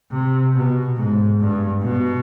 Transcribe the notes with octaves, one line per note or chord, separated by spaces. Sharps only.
C3
B2
G#2
G2
B2